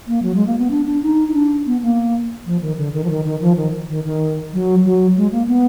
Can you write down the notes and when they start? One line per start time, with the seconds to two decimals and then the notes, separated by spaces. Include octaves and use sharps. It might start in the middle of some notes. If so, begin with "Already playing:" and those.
0.07 A#3
0.23 F#3
0.35 G#3
0.46 A#3
0.59 B3
0.71 D4
0.87 D4
1.03 D#4
1.28 D#4
1.34 D4
1.66 B3
1.82 A#3
2.46 F3
2.62 D#3
2.77 D3
2.93 D#3
3.04 F3
3.10 D#3
3.25 D#3
3.41 F3
3.57 D#3
3.89 D#3
4.05 D#3
4.53 F#3
4.85 F#3
5.17 G#3
5.32 A#3
5.48 B3